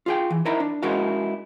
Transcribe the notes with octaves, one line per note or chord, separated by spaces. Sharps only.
F4 G#4 G5
E3
D#4 E4 A#4 E5 A#5 B5
D4
G#3 C#4 E4 F#4 A#4 F5